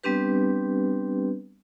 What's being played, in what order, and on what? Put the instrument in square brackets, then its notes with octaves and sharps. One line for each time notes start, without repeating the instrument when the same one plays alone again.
[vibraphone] G3 B3 C4 D4 G4 B4